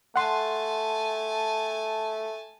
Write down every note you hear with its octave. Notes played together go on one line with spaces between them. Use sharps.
A3 F#5 G#5 A5 C6